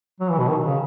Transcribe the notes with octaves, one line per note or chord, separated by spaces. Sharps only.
F#3
E3
B2
D#3
C#3